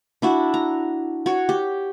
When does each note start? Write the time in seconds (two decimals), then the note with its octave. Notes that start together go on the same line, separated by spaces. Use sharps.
0.22 D4 E4 F#4
0.54 A#5
1.26 F#4 C#5
1.49 G4